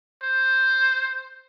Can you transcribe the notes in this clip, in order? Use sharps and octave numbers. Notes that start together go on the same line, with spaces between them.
C5